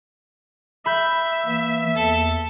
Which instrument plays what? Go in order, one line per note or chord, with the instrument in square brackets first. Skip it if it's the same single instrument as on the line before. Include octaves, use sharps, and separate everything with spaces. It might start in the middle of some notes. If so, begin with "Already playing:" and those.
[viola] E5 [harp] B5 G6
[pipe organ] E3 A#3
[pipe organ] E2 [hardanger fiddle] A4